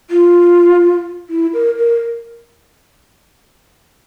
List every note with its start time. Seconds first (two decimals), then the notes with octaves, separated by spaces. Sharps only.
0.10 F4
1.30 E4
1.53 A#4
1.78 A#4